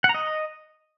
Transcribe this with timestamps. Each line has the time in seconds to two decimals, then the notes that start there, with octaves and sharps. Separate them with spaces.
0.04 F#5
0.09 A#5
0.14 D#5